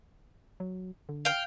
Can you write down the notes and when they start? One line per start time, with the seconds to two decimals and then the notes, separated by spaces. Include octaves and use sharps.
0.60 F#3
1.09 D3
1.25 F5 G5